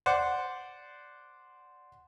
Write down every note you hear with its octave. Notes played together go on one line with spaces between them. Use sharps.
C5 D5 F#5